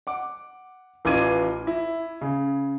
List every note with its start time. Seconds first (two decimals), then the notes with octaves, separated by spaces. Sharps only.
0.07 F#5 D6
1.05 A1 E3 F4 D6 G#6 D#7
1.67 E4
2.21 C#3